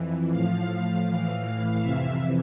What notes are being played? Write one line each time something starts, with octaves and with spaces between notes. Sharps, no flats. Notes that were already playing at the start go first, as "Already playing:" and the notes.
Already playing: F2 E3
A2 F3 F5
A2 E3
F2 C3 E3 E5